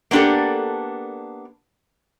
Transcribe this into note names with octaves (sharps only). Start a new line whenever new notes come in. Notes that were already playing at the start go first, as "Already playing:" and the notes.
A#3 B3 D4 G4 A4